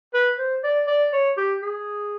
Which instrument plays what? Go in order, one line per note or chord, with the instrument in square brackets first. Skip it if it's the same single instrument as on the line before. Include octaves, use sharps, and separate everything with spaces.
[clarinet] B4
C5
D5
D5
C#5
G4
G#4